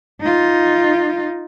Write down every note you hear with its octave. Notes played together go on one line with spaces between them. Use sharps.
D#4 F4